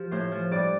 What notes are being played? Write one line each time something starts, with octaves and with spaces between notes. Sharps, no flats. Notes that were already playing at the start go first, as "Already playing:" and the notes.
Already playing: F3 G4
A2 C5
F3
G2 D5